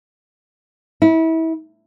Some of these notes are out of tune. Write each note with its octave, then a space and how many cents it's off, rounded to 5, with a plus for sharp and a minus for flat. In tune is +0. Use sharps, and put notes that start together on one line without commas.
E4 -30